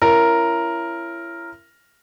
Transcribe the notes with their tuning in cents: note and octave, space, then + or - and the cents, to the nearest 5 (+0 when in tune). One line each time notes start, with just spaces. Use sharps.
C#4 +0 E4 +35 A#4 +0